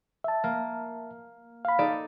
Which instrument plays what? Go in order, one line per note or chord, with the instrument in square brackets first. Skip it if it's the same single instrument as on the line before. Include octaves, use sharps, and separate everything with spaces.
[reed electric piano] E5 A5
[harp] A#3
[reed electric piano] F5 B5
[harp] D#4 A4 D5